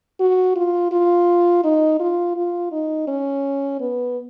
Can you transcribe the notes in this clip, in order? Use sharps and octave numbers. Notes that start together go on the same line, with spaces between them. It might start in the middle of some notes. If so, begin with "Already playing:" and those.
F#4
F4
F4
D#4
F4
F4
D#4
C#4
B3